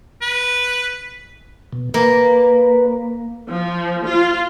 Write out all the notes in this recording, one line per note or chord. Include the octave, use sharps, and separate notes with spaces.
B4
B2
A#3 B4
F3
F4